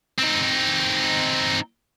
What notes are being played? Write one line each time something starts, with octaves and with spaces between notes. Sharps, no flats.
C4 D#4